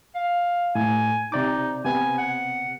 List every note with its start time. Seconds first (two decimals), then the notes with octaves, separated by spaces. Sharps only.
0.15 F5
0.75 A2 G#5
1.32 C3 D#4 D5 D6
1.85 C3 B3 G#5
2.18 F#5